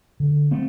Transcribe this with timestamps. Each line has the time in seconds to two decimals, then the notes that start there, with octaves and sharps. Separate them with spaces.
0.20 D3
0.51 A3 C4